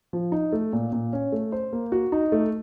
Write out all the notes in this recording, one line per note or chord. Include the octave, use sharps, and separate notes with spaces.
F3
D#4
A3
A#2
A#2
C#4
A3
C5
A#3
F#4
D#4
A3